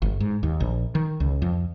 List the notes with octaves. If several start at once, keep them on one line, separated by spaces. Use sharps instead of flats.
G1
G#2
D#2
A#1
D#3
C#2
F2